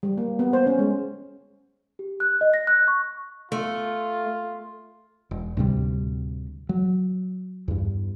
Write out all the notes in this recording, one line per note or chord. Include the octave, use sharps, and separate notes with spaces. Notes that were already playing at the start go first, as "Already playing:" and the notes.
G3
A#3
B3
C5
C#4
G#3
G4
F#6
D#5
A#6
F#6
C#6
A3 F4
E1
D2 A2 C3 G3
F#3
E2 G2